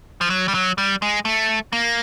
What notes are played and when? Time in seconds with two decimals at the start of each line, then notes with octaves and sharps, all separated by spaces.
0.21 F3
0.30 F#3
0.48 G3
0.54 F#3
0.78 G3
1.02 G#3
1.25 A3
1.73 A#3